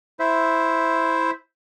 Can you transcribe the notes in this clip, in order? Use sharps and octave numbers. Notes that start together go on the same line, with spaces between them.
E4 C5 E5